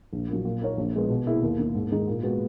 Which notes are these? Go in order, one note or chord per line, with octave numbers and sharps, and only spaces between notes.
A#1
A#2 F#3
A#2
A#3 D#4 A#4 C#5
A#1
A#2 G#3 B3
B2
A#3 E4 G#4
D#2
D#3 A#3
G#2
D#3 G#3 D#4 G#4
A#2
G#3 B3 F#4